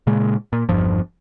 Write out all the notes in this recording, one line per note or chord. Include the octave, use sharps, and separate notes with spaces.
A#2 C#3 G#3
A#2
G1 E2 G2 F3